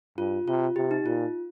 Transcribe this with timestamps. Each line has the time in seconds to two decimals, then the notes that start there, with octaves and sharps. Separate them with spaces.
0.18 G2 F4
0.47 C3 F4
0.76 C3 G4
0.91 D#4
1.05 A#2 F4